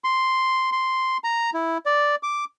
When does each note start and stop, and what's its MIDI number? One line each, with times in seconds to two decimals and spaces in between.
0.04 0.70 84
0.72 1.17 84
1.24 1.50 82
1.54 1.78 64
1.86 2.15 74
2.23 2.45 86